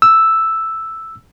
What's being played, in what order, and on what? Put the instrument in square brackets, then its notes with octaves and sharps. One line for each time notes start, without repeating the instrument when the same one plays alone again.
[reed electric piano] E6